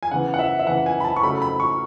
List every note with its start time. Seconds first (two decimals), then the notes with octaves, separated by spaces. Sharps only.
0.03 G#5
0.11 C#3 E3 B3 F#5
0.34 F#5
0.39 E5
0.59 E5
0.67 C#3 E3 B3 F#5
0.86 G#5
1.00 B5
1.04 A5
1.16 C#6
1.23 C#3 F#3 A3 B5
1.42 B5
1.60 C#6